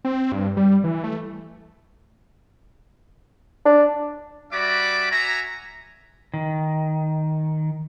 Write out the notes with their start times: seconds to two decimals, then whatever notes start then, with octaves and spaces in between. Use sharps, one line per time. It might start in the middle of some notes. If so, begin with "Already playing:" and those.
0.05 C4
0.32 G2
0.57 G3
0.84 E3
1.04 A3
3.65 D4
4.52 G3 F#4 D5 E5 B5 D6
5.11 F#4 E5 G#5 A#5
6.34 D#3